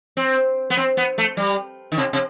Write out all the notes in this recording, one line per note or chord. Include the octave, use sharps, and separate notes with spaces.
C4
B3
C4
B3
A3
G3
D#3
C3
C3